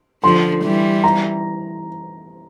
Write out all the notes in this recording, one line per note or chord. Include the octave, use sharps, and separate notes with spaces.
D3 F3 C6
E3 G3
A#5